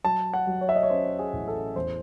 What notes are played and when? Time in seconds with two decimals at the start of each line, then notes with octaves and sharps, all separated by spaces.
0.04 F#3 A5
0.34 F#5
0.47 F#3
0.61 C#5
0.69 E5
0.76 D#5
0.83 C#5
0.90 C#4 C5
1.19 G#4
1.33 A1
1.48 A4
1.76 E2 C5